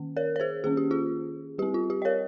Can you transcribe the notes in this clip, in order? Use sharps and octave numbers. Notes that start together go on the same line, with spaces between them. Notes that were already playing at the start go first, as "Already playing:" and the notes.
Already playing: D#3 A#3 C#4
A#4 C#5
C#5
G#4 C5
D#3 A#3 C#4 G#4
G4
F4 G#4
G3 C4 G4
F4
G4
D#5
A#4 C#5